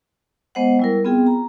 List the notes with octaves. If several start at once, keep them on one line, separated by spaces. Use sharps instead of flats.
G#3 B3 C5 D#5 F#5
G3 E4 A#4
B3 C4 F4 G#4 G5
A#5